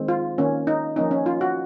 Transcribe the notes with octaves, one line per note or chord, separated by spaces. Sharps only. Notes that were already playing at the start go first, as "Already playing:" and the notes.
Already playing: D#3 G#3 C4
F4
D#3 A#3 C#4
D#4
F3 A#3 C#4 D#4
C#4
F4
F#4